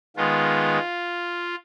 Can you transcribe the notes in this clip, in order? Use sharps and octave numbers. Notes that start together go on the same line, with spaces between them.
D#3 G#3 B3 F4